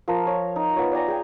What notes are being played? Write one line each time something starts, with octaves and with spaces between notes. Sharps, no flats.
F3 A#4
C#5
D#4
B3 F4 C#5
D5 G5 G#5 A#5
G#4 G5